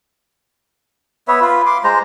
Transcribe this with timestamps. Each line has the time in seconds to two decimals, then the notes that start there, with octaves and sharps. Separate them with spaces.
1.28 B3 B4 C#5 E5
1.41 F4 B4
1.66 C6 D6
1.84 G#3 C5 A#5